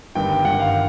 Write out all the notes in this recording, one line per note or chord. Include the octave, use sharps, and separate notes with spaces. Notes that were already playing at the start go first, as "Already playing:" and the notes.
G1 G2 D#3 G5
G1 G2 D#3 F#5
F5